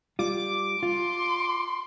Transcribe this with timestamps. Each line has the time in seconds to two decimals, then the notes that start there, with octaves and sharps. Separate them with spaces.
0.19 G3 F4 D6
0.83 F4 C6